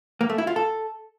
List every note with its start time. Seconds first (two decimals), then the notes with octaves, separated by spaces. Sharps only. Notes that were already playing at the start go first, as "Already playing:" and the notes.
0.21 A#3
0.29 A3
0.38 E4
0.47 F4
0.56 A4